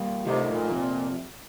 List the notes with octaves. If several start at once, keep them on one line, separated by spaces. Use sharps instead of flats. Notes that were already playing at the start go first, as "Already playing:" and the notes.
Already playing: G3 A#3
C3 F3 A3 D#4 A#4 D5
A#2
F2 C3 F3